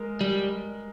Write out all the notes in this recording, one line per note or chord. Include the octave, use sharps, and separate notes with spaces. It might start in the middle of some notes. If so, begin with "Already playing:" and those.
Already playing: G#3 A#4
G3